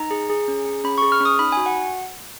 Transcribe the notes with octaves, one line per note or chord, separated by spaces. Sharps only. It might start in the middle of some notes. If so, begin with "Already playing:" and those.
Already playing: D#4 A#5
G#4
G#4
C#4
G#4
C#4 B5
G#4 C#6
F6
C#4 D#6
D#4 B5
F#4 G#5
F#5